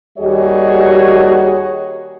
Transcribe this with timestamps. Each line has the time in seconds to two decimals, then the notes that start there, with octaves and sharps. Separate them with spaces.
0.18 D#2 G3 F#4 G#4 C#5 D#5